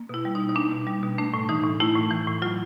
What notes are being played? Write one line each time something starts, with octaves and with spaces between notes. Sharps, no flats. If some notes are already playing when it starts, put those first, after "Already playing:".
Already playing: A#3
B2 E4
G3
B2 D#4
D#4
A#3 D4
B2
G3
B2
A3 D4
A2
E3 D#4
A2
A3 E4
A2
E3
A2
F#3 F4